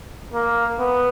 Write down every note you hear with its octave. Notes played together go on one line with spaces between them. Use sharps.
A#3
B3